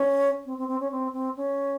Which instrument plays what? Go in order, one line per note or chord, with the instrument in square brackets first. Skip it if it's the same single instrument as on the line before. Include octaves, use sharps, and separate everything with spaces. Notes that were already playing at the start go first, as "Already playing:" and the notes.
Already playing: [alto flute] C#4
C4
C4
C4
C#4
C4
C4
C#4